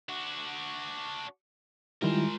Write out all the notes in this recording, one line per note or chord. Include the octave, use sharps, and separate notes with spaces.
D4 F#4
D#3 G3 G#3 E4 F4 A#4 C5